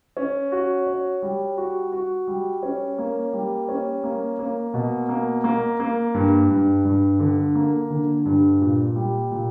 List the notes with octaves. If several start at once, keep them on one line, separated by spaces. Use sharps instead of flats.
C#4
F#4
C#5
G3
F#4
F#4
G3
C#4
A#3
G3
C#4
A#3
A#3
B2
A#3
A#3
A#3
G2
G2
G2
D3
A#3
D3
G2
A#2
G3
A#2